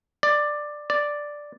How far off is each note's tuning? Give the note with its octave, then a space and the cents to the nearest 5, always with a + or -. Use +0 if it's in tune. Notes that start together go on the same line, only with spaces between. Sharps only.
D5 +10
D5 +0